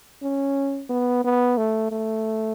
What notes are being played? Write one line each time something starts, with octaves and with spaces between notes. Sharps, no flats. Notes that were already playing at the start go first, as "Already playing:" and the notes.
C#4
B3
B3
A3
A3